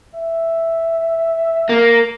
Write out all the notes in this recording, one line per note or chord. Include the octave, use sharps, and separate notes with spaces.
E5
A#3